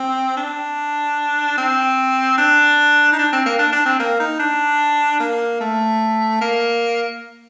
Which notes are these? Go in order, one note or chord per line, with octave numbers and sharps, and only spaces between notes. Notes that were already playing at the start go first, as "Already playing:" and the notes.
Already playing: C4
D4
C4
D4
D#4
D4
C4
A#3
D4
D4
C4
A#3
D#4
D4
A#3
A3
A#3